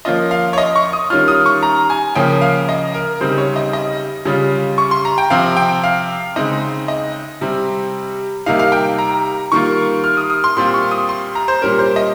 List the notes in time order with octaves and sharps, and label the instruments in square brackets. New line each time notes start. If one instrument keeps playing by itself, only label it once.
[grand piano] F3 A#3 C#4 F4 D#5
F5
C#5
D#5
C#6
D#6
D#3 G3 C#4 F4 F6
D#6
C#6
A#5
G#5
C#3 F3 A#3 C#4 G5
F5
D#5
A#4
C#3 G3 C4 D#4 C5
C#5
D#5
D#5
C#3 G3 C#4 F4
C#6
C6
A#5
G5
C3 F3 C4 F5
G5
F5
C#3 G#3 C4 D#4 D#5
D#5
C3 G3 C4
C3 G3 A#3 D#4 F5
F5
G5
A#5
D#3 G3 A#3 F4 C#6
F6
D#6
D#6
C6
A#2 G3 C4 F4 C6
C#6
D#6
C6
A#5
C5
A#2 G3 C#4 A#4
C5
D#5